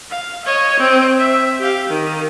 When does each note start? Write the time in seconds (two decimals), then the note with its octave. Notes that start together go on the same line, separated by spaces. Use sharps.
0.11 F5
0.45 C#5 D#5
0.79 C4
1.19 E5
1.59 G4 F5
1.89 D#3